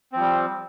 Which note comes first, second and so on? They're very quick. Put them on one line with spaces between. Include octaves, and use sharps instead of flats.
C4 F3 G3